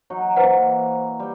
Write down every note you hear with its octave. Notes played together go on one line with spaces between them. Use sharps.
F#3 D#4
E3 A#3 B4 C5 F#5
G3 G5